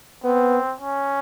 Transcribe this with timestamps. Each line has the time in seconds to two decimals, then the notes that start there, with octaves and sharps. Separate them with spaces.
0.24 B3 C4
0.80 C#4